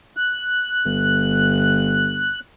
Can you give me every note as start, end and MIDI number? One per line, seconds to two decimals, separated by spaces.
0.17 2.40 90
0.85 2.34 31